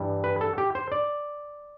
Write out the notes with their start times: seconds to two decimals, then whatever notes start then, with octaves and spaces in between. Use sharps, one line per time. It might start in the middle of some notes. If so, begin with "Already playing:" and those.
Already playing: G2 E3 G3
0.24 B4
0.41 A4
0.58 G4
0.75 C5
0.92 D5